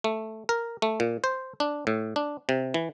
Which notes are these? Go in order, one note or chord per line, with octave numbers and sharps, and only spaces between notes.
A3
A#4
A3
A#2
C5
D4
A2
D4
C3
E3